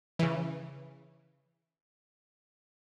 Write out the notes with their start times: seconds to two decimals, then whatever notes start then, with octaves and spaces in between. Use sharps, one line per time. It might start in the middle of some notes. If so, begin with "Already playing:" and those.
0.19 C#3 E3